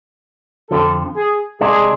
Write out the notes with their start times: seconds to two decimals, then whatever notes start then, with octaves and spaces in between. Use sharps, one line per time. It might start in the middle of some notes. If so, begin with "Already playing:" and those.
0.71 F2 D3 F3 A4
1.16 G#4
1.61 C3 G#3 D4 G#4